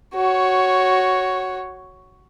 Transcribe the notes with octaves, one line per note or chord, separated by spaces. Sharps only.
F#4 C#5